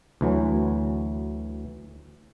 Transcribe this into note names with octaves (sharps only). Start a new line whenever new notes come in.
D2 E3 F#3